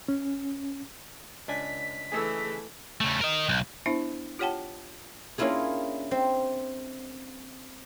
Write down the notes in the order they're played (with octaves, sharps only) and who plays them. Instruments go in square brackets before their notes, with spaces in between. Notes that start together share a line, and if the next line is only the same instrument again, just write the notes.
[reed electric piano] C#4
[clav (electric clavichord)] C#2 D4 G#5 [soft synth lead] B6
[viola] E3 A3 [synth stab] G#4 A4 E6
[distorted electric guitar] C#3 A3
A#4 D#5
B1
[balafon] B3 D4 E4 C5 E5
F4 G4 C#5 F#5 G5 A5
[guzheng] A#3 C#4 D4 E4 F4 G#4
C4